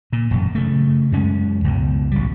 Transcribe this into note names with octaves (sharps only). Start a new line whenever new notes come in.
A#2
E1 F#2
C#3 A3
F#2 G#3 C#4
C#2 B2
A1 G3